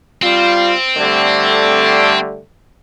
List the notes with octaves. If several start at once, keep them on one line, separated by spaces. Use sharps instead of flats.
G3 C4 F4
D3 G3 A3